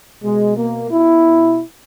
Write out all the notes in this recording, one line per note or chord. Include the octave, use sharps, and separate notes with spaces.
B2 G#3
A#3
B2 E4